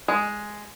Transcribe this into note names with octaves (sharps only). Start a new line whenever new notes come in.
G#3